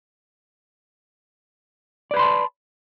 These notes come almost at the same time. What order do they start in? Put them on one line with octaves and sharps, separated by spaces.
D5 B4 B5 C6 A5